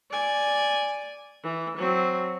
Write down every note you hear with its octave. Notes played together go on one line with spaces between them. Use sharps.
D5 G#5
E3
F#3 C4